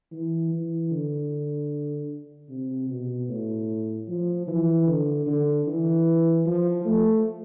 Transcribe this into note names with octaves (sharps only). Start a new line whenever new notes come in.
E3
E3
D3
C3
B2
A2
F3
E3
D3
D3
E3
F3
A3